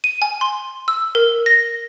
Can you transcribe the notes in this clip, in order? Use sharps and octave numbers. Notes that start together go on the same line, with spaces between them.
D#7
G#5
C6
E6
A#4
A#6